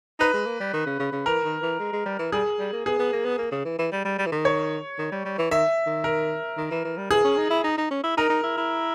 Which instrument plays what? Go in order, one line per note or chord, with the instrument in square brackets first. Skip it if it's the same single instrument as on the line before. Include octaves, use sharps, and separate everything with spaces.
[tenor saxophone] D#4 [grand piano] B4
[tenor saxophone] G#3
A#3
G3
D#3
C#3
C#3
C#3
[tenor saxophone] E3 [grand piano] A#4
[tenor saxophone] D#3
E3
G#3
G#3
G3
E3
[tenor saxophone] G3 [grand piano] G#4
[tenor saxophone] G3
A#3
[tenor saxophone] B3 [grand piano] G#4
[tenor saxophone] B3
A#3
B3
A#3
C#3
E3
E3
G3
G3
G3
E3
D#3
[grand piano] C#5
[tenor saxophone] D#3
G3
G3
E3
[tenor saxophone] D#3 [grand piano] E5
[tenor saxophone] D#3
[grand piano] A#4
[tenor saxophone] D#3
E3
E3
G3
[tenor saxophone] E3 [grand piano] G#4
[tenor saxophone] C#4
D#4
E4
D#4
D#4
C#4
E4
[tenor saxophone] D#4 [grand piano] A#4
[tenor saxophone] D#4
E4
E4